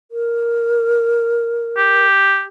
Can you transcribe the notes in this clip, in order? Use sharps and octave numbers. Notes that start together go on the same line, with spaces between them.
A#4
G4